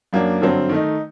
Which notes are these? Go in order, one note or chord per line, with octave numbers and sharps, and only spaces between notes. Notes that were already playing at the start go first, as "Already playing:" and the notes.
F#2 F#3 A#3 D4
G2 D3 F#3 C4
D#3 A3 D#4